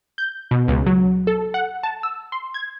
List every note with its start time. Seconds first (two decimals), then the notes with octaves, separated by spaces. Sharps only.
0.18 G6
0.51 B2
0.68 C#2
0.86 F#3
1.27 A4
1.54 F#5
1.83 A5
2.03 E6
2.32 C6
2.54 G#6